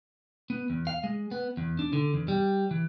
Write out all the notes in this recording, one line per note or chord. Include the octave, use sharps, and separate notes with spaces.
B3
E2
F5
G#3
B3
E2
D4
D3
E2
G3
E3